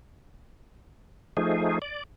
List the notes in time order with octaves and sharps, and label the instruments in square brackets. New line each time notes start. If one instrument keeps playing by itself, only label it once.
[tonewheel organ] F3 A3 D#4 G#4
D5